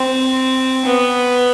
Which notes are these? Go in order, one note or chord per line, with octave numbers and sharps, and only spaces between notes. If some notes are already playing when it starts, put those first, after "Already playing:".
Already playing: C4
B3